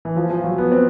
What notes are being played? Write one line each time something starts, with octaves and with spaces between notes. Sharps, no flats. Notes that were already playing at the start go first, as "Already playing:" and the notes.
E3
F3
F3
F#3
B3
C4